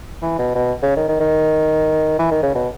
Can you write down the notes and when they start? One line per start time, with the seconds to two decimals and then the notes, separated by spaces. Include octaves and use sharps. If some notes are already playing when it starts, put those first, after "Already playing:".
0.22 E3
0.39 B2
0.55 B2
0.83 C#3
0.96 D#3
1.09 D#3
1.20 D#3
2.19 E3
2.31 D#3
2.43 C#3
2.55 B2